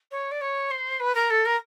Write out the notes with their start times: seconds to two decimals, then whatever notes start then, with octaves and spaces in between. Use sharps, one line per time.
0.11 C#5
0.31 D5
0.41 C#5
0.71 C5
1.00 B4
1.15 A#4
1.30 A4
1.45 A#4